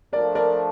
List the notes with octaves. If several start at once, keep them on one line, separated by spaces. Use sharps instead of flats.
F3 A3 D4 A#4 D5
A#4 D5